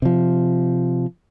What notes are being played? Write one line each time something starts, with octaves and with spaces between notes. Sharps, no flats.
C3 F3